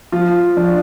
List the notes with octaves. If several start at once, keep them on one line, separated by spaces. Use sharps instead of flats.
F3 F4
F3 D4